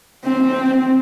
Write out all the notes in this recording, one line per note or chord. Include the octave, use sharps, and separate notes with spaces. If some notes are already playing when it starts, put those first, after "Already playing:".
C4